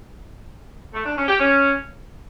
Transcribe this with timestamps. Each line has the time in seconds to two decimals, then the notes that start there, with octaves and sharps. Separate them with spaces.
0.94 A3
1.06 D4
1.17 C#4
1.28 G4
1.40 C#4